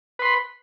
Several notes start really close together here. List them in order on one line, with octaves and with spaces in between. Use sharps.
B4 C6 B5